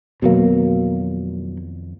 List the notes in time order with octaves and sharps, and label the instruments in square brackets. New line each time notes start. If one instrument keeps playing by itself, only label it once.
[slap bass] F2 D#3 A3 [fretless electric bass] B2 F#3 A#3